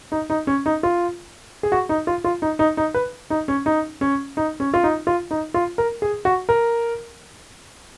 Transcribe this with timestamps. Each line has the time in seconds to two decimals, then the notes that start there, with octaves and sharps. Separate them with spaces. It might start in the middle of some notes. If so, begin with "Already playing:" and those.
0.12 D#4
0.30 D#4
0.47 C#4
0.66 D#4
0.83 F4
1.63 G#4
1.72 F#4
1.89 D#4
2.07 F4
2.24 F4
2.42 D#4
2.59 D#4
2.77 D#4
2.94 B4
3.30 D#4
3.48 C#4
3.66 D#4
4.01 C#4
4.37 D#4
4.60 C#4
4.74 F4
4.84 D#4
5.07 F4
5.31 D#4
5.54 F4
5.78 A#4
6.02 G#4
6.25 F#4
6.49 A#4